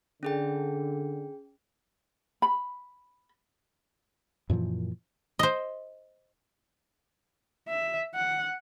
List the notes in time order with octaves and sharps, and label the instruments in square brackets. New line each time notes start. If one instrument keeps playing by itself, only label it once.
[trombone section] D3 [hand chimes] C#4 G#4 G5
[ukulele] B5
[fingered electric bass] F#2 A#2 E3 F3
[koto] C5 D#5
[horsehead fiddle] E5
F#5